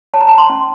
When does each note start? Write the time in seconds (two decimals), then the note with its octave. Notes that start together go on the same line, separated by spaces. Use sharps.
0.14 C#5 A5
0.21 A#5
0.28 A5
0.38 C6
0.50 C#4